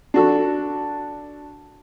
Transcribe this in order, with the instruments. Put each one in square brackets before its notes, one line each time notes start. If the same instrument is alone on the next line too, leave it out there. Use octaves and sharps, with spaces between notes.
[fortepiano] D4 F#4 A4